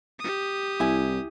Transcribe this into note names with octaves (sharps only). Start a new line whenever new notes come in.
G4 D#6
C2 E4 G#5